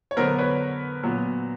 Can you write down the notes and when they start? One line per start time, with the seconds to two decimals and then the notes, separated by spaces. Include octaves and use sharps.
0.11 C#5
0.17 D3 F#3 B3 A#4 C5
0.39 B4 C#5
1.03 A#2 F#3 B3